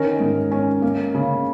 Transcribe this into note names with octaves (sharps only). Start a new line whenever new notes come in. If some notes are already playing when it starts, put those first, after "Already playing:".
Already playing: D#3 C#4 A#4
G#2
C#4
A#3
C#3